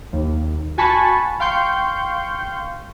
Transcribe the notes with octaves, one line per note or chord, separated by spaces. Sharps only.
D#2
F#4 G#5 A5 B5 C#6
F5 G5 C6 C#6 G6